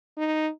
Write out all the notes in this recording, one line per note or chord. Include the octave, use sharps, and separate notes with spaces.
D#4